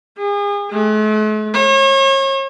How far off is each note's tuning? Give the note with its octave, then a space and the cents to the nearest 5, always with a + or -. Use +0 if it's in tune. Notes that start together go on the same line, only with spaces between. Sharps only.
G#4 -35
A3 -45
C#5 -40